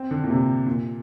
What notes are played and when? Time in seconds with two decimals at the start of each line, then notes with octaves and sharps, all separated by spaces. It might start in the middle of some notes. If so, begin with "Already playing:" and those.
Already playing: C4
0.11 D3
0.24 A#2
0.30 C3
0.67 A#2